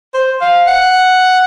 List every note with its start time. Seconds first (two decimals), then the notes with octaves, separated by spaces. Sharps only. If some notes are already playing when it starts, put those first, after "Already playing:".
0.14 C5
0.41 F5
0.67 F#5